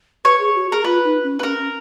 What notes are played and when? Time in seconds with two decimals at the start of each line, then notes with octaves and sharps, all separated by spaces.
0.25 B4 C#5
0.40 G#4
0.55 F#4
0.70 G#4 A#4
0.84 F4 B4
1.05 D#4
1.24 C#4
1.39 B4
1.43 C#4 A#4
1.58 C#4